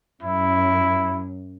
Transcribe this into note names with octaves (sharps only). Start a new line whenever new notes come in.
F#2 E4